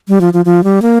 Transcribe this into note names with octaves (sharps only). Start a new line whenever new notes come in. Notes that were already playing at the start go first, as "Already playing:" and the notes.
G3
F3
F3
F3
G3
A#3